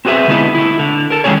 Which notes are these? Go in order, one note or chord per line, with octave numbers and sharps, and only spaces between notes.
C4 F#4 G#4 B4 E5
D3 G#3 B3 D#4 E4
A3 E4
D3
A4 A#4
D#3 G#3 B3 C#4 G#4 C#5